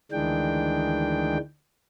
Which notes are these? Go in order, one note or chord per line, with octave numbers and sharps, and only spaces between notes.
D2 D#3 E3 G#3 D4 G5